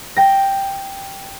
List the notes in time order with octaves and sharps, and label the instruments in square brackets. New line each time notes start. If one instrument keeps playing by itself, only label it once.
[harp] G5 A#6